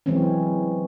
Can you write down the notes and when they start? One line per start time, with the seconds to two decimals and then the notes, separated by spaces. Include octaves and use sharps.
0.06 E3 F#3 G#3 C4 C#4